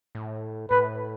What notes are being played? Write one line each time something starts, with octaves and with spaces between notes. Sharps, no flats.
A2
A2 B4